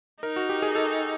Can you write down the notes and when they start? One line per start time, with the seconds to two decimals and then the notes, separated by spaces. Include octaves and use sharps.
0.23 D#4 A#4
0.36 F#4
0.49 G4
0.62 G#4
0.75 A4